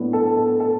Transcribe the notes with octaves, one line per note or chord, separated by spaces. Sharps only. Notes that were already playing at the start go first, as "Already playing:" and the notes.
Already playing: A2 F#3 B3 D4
A4
A4
A4